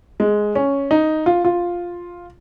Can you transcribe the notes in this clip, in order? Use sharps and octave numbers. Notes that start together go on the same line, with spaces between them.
G#3
C#4
D#4
F4
F4